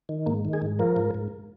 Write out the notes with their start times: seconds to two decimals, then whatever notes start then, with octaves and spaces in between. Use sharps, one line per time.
0.09 D#3
0.26 G#2 A#3
0.45 D#3
0.53 G#4
0.62 G#2
0.79 F3 A#4
0.96 G#2
1.15 G#2